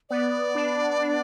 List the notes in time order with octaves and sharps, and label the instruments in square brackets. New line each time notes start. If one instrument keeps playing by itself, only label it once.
[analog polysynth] B3 [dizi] D5
[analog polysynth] D4
D4